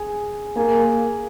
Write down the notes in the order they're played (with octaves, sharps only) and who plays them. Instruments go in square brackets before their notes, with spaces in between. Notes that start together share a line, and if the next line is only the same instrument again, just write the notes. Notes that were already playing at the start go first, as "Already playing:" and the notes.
Already playing: [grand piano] G#4 G#5
[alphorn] A#3 [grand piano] G#4 G#5